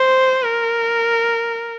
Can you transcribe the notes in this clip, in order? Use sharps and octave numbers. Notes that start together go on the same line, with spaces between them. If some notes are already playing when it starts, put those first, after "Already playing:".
Already playing: C5
A#4